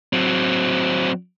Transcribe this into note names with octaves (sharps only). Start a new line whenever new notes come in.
F#3 C4